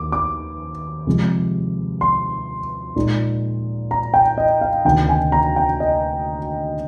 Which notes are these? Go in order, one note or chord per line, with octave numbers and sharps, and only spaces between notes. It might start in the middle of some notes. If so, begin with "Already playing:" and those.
Already playing: D#2 A#3 D6
D6
C3 F3 G#3
C6
A#2 G#3 D#4
A#5
G5
D#5
F5
D2 C3 D#3 A#3 G5
G#5
A#5
G5
D#5